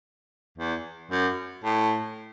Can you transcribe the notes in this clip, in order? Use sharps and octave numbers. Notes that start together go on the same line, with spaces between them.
E2
F#2
A2